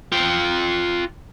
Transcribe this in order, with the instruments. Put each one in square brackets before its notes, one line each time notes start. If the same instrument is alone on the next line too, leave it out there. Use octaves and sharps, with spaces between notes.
[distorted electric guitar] F4 G5